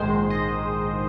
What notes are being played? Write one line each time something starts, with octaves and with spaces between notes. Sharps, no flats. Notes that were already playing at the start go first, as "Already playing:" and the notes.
Already playing: A#1 G#2 D#3 G#3 C5
D#5